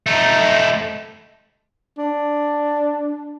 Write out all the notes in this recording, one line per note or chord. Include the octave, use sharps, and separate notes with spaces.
A3 D#4
D4